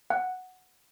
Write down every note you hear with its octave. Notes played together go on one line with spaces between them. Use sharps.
F#5